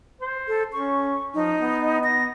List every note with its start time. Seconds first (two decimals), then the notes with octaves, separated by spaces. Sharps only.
0.21 C5
0.48 A4
0.73 C#4 C#6
1.35 F3 D#4
1.60 B3
2.04 A#6